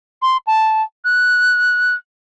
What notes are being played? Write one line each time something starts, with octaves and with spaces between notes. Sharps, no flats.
C6
A5
F#6